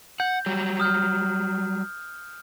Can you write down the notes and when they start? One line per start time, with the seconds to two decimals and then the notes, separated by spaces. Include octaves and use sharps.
0.20 F#5 G6
0.46 F#3 G3
0.80 D#6 F6 G6